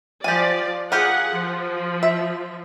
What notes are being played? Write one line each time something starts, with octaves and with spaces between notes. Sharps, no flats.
F3 G4 D5 G#5
F4 G4 G#4 A#4 F#5
F3
E5